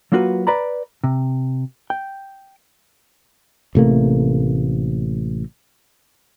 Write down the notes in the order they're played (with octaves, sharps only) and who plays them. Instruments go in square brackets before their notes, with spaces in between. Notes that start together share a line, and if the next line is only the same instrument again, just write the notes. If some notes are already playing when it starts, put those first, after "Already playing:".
[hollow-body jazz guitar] F#3 A#3 F4 F#4 A#4 B4
B4 D5 A#5 B5
C3
G5
[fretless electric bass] A1 C3 A3 A#3